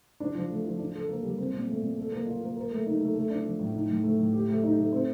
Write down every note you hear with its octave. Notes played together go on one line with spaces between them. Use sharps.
D4
F3
A3
F3
D4
A4
A#3
G3
C4
A#2
A3
A#2
A4
A#3
F4
A#3
A#4
A3
D#4
A3
A3
D4
F3
A2
D#4
A2
A3
A2
G4
A3
D#4
A3
C4